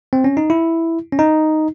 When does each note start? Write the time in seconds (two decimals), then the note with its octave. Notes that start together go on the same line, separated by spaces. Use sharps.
0.13 C4
0.24 C#4
0.37 D#4
0.50 E4
1.12 C#4
1.19 D#4